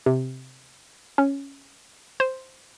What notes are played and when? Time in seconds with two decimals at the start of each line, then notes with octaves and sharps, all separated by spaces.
0.06 C3
1.18 C#4
2.20 C5